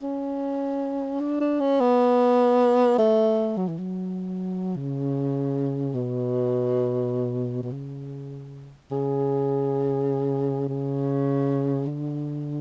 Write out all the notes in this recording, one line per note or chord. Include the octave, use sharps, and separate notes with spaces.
C#4
D4
D4
C#4
B3
A3
F#3
E3
F#3
C#3
B2
B2
C#3
C#3
C#3
D3